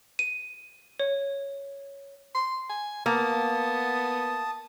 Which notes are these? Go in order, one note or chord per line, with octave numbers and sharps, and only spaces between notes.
D#7
C#5
C6
G#5
A#3 B3 A5 D#6